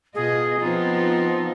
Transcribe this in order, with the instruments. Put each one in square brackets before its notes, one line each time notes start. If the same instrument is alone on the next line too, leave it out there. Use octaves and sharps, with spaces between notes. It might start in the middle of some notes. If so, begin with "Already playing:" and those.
[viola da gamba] B2 F4 D#5 [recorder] G#4
[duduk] F3 [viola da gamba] B3 C4 D#4 [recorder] F4